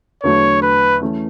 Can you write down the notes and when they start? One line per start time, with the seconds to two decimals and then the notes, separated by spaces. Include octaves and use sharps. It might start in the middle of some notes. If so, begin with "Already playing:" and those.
0.23 E2 D3 F#3 A3 C#5
0.63 B4
1.01 E3 A3 C#4